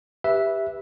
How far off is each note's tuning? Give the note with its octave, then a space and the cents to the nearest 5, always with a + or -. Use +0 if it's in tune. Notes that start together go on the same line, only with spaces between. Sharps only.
G4 +10 B4 -10 E5 -5